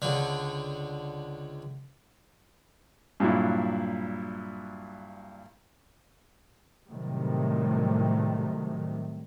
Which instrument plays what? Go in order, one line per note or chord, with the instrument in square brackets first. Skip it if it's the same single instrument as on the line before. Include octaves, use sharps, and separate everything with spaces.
[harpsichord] C#2 D3
[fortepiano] G2 A#2 F#3 E4
[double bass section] A2 C3 D#3 F#3 G3 A3